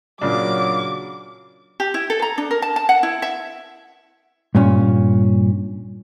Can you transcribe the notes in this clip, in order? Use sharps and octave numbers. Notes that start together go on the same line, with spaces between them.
A#2 C#3 F#3 D4 D6
G4
E4
A4
A#5
D4
A#4
A5
A5
F#5
E4
E5
G2 A#2 C#4